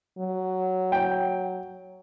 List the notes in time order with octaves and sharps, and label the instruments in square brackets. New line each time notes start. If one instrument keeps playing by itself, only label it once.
[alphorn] F#3
[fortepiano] G5